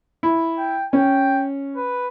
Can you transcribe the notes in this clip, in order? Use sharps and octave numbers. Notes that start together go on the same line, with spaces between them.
E4
G5
C#4 G5
B4